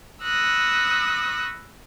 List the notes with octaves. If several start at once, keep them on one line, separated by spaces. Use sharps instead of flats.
B5 C#6 D#6 E6 F#6 A#6